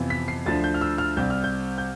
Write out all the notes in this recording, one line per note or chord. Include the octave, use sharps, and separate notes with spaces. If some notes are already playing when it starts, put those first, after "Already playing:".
Already playing: F2 C3 E3 B3 F4
B6
C7
D2 D3 F3 A6
G6
F6
E6
F6
C2 C3 G3 G6
F6
G6
G6